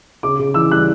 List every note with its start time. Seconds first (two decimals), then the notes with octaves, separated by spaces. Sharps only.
0.23 C#3 D6
0.39 C#3
0.54 E3 E6
0.71 G3 F#6